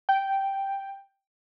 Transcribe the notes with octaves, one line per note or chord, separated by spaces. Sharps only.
G5